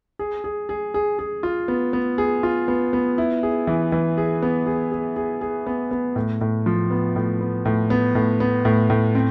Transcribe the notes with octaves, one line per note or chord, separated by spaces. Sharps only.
G#4
G#4
G#4
G#4
G#4
F4
B3
B3
G#4
F4
B3
B3
E4
G#4
E3
E3
G#4
B3
G#4
G#4
G#4
G#4
B3
B3
A2
A2
F3
B3
A2
B3
A2
B3
A2
B3
A2
A2
C4